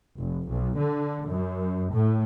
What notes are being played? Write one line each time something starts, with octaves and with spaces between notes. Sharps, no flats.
F1
B1
D3
F#2
A2